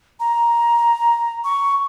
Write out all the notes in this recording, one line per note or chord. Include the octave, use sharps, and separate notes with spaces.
A#5
C#6